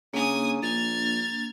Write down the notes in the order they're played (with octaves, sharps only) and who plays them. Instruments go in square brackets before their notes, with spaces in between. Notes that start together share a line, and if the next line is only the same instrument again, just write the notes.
[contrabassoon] C#3 [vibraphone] A#3 D4 [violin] G#5 D#6
[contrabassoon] A#1 [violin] F6 G#6 [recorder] A6